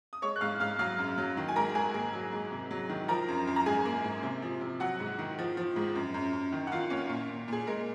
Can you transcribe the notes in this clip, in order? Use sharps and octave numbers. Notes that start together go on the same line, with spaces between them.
D#6
G#3 C#5 C#6
F#6
G#2 F5 F6
G#2 F5 F6
F#3 F5 F6
F#2
F#3
D#3
G#5
G#2 A#4 A#5
G#2 G#4 G#5
A#3 G#4 G#5
F#3
G#2
C3
F#3
D#3
F3 A#4 A#5
F#2
F#2
A#5
G#2 G#4 G#5
A#3
G#2
C3
F3
C3
F#3 F#4 F#5
G#2
D#3
F3
F3
G#2
F#2
F#2
F#2
D#3
F#5
D#3 F4 F5
A#3 C#4 C#5
A#2
A#2
A#2 G#4
G#3 A#4